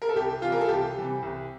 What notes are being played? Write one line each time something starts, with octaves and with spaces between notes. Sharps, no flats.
A#4
A4
C2 G4
C3 E3 G3 F4
A#4
A4
C2 G4
C3 E3 G3
C2